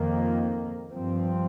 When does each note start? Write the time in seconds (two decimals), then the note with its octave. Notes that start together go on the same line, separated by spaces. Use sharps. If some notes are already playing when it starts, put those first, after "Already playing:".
Already playing: F2 D#3 A#3
0.91 G2 F3 C4